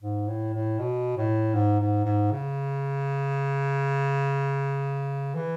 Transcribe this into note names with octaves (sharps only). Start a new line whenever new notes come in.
G#2
A2
A2
B2
A2
G#2
G#2
G#2
C#3
E3